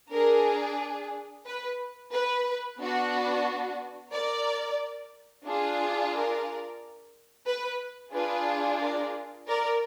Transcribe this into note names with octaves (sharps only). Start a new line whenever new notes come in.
D4 G#4 A#4
B4
B4
B3 D4 F#4
A#4 D5
D4 F4 G#4
A#4 D5
B4
D4 F4 G#4 B4
A#4 D5
A#4 D5